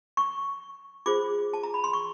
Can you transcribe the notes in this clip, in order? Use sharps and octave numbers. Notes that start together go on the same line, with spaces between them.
C#6
F4 G#4 C5 D6
A5
A#5
B5
C6
C#6